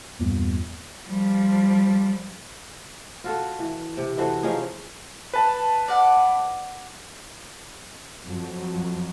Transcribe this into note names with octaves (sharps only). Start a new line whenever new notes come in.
E2 G2 A#2 B3
F3 G3
F4 F#4 A4
E3
C3
E3 F#4 A4 C5
F3 C#4 D#4 G#4
B4 A5
D5 F#5
F2 F#3